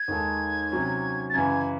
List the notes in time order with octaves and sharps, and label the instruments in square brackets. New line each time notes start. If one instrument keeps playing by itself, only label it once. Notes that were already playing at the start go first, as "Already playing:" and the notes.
Already playing: [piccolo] G#6
[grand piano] D#2 D#3 G#3 D#4 A4
C3 F#3 C#4
[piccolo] A6
[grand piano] F#2 C#3 E3 [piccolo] G#6